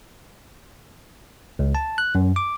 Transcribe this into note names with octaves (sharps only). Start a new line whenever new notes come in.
C#2
A5
F#6
F#2
D6